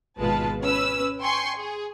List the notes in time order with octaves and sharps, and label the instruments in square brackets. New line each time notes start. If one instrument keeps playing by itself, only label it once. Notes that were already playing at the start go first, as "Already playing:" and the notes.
[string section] G#1 B2 G#3 F4 B4 A5
C#4 B4 E6
G5 G#5 C6 C#6
G#4